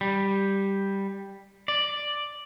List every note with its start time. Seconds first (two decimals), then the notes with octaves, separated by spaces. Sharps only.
0.01 G3
1.68 D5